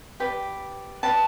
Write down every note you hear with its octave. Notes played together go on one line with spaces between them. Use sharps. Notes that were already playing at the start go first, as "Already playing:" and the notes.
G4 B4 D5 G5
G4 B4 D5 A5